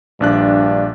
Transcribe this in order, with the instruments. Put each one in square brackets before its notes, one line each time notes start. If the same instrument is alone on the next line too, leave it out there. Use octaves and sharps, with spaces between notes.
[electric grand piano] A#1 D4 F#6 [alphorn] G2